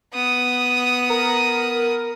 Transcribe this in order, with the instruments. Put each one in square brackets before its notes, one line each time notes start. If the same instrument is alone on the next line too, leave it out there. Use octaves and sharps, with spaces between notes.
[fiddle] B3 D#6
[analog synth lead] A#4